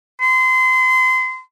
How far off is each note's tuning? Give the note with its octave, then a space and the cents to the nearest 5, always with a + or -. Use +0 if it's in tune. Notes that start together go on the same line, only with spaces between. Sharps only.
C6 -30